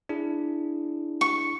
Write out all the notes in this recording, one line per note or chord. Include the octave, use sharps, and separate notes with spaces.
D4 E4 G#4
C#6